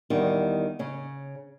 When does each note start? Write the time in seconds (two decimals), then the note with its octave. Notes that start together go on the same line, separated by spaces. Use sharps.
0.10 E2 D#3 G3
0.79 C#3 C#4